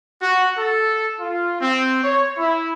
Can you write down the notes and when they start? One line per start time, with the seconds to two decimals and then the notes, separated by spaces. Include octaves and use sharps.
0.21 F#4
0.57 A4
1.19 F4
1.60 C4
2.03 C#5
2.38 E4